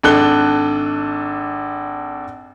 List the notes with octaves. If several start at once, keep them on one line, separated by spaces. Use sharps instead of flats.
G#1 D4 A4 F#6 G7